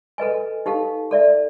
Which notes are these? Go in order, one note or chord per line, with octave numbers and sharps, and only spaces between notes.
A4 B4 D#5 G#5
D#4 G4 A4 F5
A4 D5 E5